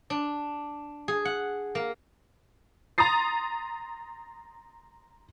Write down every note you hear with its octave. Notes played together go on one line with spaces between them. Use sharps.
D4
G#4
F#5
A#3
A#5 C6 D#6 A6 C7